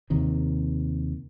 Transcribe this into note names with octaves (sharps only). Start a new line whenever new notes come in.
D#2 C3 D#3